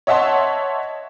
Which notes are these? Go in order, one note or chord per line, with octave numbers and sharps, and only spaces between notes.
C#5 D#5 E5 F#5 A5 C6